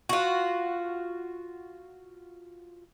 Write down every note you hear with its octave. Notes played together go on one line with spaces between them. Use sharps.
F4 F#4